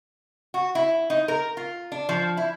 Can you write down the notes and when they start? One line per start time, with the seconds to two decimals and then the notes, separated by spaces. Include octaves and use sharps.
0.54 F#4
0.75 E4
1.10 D#4
1.28 A#4
1.57 F4
1.92 D4
2.09 F3
2.37 E4